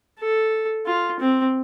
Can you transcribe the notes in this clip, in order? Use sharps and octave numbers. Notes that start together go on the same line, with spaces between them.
A4
F4
C4